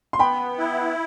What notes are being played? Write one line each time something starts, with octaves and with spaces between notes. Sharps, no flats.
C6
B3 G5 B5
E4